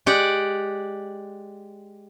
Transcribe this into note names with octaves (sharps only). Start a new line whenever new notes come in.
G#3 G4 D5 F#5